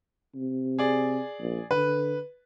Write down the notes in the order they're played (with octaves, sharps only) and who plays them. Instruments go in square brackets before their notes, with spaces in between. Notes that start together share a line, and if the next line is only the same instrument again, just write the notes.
[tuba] C3
[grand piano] G#4 D5
[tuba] A#1
[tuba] D3 [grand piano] B4